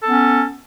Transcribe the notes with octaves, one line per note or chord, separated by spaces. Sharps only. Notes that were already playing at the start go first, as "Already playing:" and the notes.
B3 C#4 A4